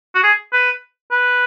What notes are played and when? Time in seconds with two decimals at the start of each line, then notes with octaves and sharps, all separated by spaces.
0.15 F#4
0.23 G#4
0.53 B4
1.12 B4